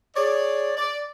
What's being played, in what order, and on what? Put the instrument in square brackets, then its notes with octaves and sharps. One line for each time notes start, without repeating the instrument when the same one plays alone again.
[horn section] G#4 C#5 D5
D5